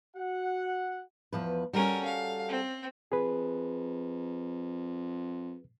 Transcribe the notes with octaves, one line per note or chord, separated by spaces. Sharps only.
F#4 F#5
E2 F3 B4
G3 C#4 F#4 A4 A#4
F5
C4
F2 G#4 B4